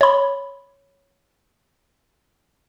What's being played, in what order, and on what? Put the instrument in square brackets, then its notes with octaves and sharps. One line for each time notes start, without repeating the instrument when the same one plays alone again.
[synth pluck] C#5 B5